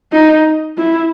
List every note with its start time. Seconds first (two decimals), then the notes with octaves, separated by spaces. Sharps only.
0.12 D#4
0.77 E4